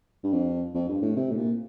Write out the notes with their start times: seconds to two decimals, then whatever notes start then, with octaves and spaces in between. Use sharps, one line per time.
0.24 G2
0.33 F2
0.75 F2
0.89 G2
1.02 A2
1.16 C3
1.31 A2
1.37 A#2